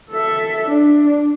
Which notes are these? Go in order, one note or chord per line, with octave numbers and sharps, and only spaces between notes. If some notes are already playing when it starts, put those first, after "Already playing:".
A4 E5
D4